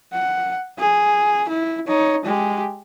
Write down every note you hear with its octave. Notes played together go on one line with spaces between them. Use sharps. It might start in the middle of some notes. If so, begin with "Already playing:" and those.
F#5
G#4
E4
D#4 C#5
G#3 G4